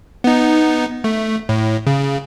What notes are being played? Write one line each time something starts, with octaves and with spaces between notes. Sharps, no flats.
B3 D#4
A3
A2
C#3